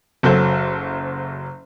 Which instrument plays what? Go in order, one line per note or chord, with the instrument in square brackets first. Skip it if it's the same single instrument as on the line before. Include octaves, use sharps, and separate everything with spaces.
[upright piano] F#1 F#3 A4 C5